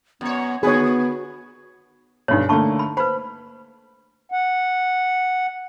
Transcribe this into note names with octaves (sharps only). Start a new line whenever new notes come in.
F#2 B3 C#5
D3 B3 F#4 G#4 B4 C#5
B1 G2 D#4 C#5
D3 A3 A#3 A5 B5 C#6
B5
B4 C5 B5
F#5